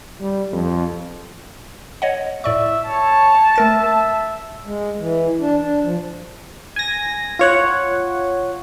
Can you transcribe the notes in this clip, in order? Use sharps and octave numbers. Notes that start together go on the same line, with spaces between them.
G3
F2
C#5 D#5 F#5
A2 D5 E5 C#6
C#5 A5
A3 A#4 E5 A6
G#3
E3
D4
D4
F3
G#5 A#6
F4 C#5 F#5